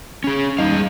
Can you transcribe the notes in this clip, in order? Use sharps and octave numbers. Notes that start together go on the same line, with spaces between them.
C#4 G#4
D#2 G3 D#4 F5
G#3